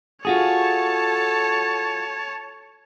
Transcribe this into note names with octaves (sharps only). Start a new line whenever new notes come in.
F4 F#4 G#4 A4 C#5 A5